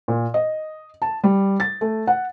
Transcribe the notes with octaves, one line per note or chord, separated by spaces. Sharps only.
A#2
D#5
A5
G3
A6
A3
F#5